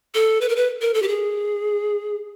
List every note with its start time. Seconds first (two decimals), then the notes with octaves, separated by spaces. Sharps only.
0.15 A4
0.41 B4
0.49 A#4
0.56 B4
0.81 A#4
0.94 A4
1.02 G4
1.08 G#4